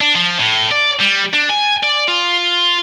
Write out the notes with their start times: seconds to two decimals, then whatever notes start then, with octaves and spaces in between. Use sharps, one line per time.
0.01 D4
0.15 F3
0.40 A2
0.72 D5
1.00 G3
1.34 D4
1.50 G#5
1.83 D5
2.08 F4